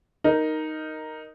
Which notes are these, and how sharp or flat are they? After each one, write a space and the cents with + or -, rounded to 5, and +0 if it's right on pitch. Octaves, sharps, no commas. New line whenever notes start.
D#4 +0 A#4 +0